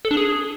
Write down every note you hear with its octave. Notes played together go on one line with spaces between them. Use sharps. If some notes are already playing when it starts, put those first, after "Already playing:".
A4
D4
G#4